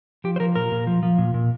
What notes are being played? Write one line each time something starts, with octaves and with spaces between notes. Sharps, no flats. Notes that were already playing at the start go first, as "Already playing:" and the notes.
F3 G4
C5
F3 A#4
A#2 A#4
A#2
F3
F3
A#2
A#2